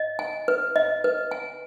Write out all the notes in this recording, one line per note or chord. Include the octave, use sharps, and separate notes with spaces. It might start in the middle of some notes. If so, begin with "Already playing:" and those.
Already playing: D#5
G#5
B4
D#5
B4
G#5